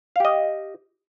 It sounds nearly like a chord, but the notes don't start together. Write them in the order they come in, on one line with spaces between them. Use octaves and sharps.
F5 G4 D#5